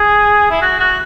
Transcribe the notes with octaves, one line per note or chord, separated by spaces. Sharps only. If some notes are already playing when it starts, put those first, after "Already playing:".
Already playing: G#4
E4
F#4
F#4